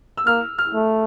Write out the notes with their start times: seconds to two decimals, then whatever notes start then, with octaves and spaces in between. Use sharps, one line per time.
0.17 E6
0.27 A#3 F6
0.58 F6
0.74 A3